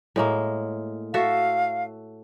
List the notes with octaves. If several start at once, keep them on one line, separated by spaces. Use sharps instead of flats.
A2 G#3 A#3
F#4 A4 E5 F5